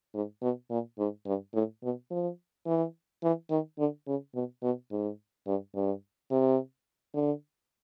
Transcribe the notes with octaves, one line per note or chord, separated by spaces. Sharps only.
G#2
B2
A#2
G#2
G2
A2
B2
F3
E3
E3
D#3
D3
C#3
B2
B2
G#2
G2
G2
C3
D3